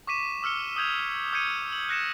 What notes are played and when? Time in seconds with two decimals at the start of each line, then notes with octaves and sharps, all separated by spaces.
0.07 C#6 D6 B6 D#7 E7
0.43 D6 E6 F6 C#7 G7
0.76 D#6 E6 G6 G#6 F7
1.33 D#6 G6 G#6 C#7 D#7
1.73 F#7
1.89 F#6 A#6 C#7 E7